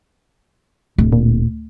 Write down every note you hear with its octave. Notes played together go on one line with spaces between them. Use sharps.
D1
A#2